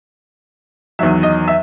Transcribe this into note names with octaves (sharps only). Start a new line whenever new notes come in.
E2 D#3 F#3 E5
D#5
E5